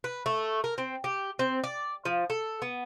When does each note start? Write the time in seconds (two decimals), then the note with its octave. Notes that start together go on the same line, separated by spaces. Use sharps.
0.04 B4
0.26 A3
0.64 A#4
0.78 C4
1.04 G4
1.39 C4
1.64 D5
2.05 F3
2.30 A4
2.62 B3